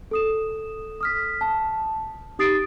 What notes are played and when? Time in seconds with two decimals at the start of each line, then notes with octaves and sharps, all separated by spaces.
0.11 A4 D#6 E7
1.01 D#6 F6 B6
1.41 A5
2.39 D#4 G4 D#6 A6 C7 D7